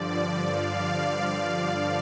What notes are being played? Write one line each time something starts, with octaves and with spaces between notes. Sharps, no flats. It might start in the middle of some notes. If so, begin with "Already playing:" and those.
Already playing: G2 D3 F3 D5
F5